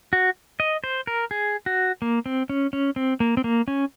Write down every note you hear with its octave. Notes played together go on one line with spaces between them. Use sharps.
F#4
D#5
C5
A#4
G#4
F#4
A#3
C4
C#4
C#4
C4
A#3
C4
A#3
C#4